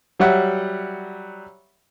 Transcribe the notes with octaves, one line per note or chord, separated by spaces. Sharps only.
F#3 G3 E5 F#5